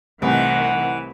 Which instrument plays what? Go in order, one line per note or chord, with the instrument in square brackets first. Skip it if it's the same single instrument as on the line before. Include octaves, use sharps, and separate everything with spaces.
[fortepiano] C2 A2 [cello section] C3 D#3 [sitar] E3 [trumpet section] F#5